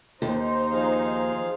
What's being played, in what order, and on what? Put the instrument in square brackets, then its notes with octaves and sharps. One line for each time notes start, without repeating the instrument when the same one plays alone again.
[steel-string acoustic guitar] D#2 [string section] D#4 C5
[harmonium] F3 G#4 F5